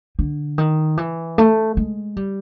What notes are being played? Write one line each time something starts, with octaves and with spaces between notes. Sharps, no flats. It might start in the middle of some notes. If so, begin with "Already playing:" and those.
D3
D#3
E3
A3
G#3
G3